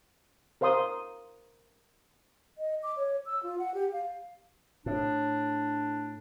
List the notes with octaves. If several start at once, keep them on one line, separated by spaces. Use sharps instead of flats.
A#4 C5 F5 C6 D#6
D#5
D6
C#5
E6
F4
F#5
G4
F5
A2 D4